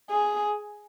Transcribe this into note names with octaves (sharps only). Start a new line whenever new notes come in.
G#4